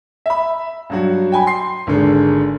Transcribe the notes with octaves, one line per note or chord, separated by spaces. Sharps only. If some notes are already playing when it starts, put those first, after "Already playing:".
E5 B5
G2 F#3 F#4
G5 G#5 B5
C6 C7
G#1 D3 G#3